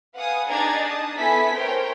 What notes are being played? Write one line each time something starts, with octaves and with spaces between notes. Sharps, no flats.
B4 F5 F#5 G#5 D#6
D4 D#4 G#4 A#5 G#6 A6
A5 D#6
B3 E4 A4 G#5 B6
A#4 C5 C#5 G5